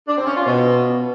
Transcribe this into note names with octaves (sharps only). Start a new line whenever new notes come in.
D4
C4
C#4
F4
B2